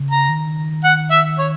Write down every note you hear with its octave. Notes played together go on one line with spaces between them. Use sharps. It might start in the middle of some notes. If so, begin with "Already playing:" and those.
Already playing: C#3
A#5
D#3
F#5
E5
C#5